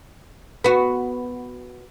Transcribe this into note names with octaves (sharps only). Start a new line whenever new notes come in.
B3 F#4